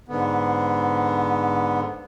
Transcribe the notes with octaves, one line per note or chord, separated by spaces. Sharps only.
G#2 D3 B3